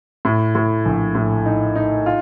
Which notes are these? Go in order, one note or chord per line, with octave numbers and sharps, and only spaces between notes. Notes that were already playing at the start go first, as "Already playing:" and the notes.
A2
A2
A#1
A2
D#4
D#4
F4